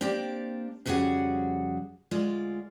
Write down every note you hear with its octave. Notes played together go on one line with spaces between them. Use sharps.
A#3 C4 D4 G4 D5
F2 C#3 G3 F#4 G#4 F#5
D2 G#3 F4 D5